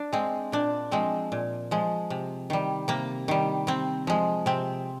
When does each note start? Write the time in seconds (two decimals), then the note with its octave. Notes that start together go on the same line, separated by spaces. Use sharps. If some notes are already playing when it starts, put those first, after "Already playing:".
Already playing: D4
0.13 G#3 C4
0.52 A#2 D4
0.91 F3 G#3 C4
1.32 A#2
1.71 F3 G#3
2.10 C3
2.50 D#3 G3
2.88 C3 A#3
3.28 D#3 G3
3.67 C3 C4
4.07 F3 G#3
4.46 C3 C4